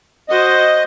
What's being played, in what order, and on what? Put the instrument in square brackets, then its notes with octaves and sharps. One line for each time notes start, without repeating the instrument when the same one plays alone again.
[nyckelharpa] F#4 C5 [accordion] D#5